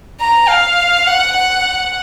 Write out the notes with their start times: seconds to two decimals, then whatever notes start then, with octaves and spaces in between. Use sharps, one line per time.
0.20 A#5
0.48 F5
1.07 F#5
1.36 F#5